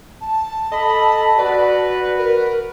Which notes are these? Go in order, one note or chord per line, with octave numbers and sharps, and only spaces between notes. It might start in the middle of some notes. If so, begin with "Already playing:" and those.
A5
A4 D#5 B5
F#4 B4 D5
A#4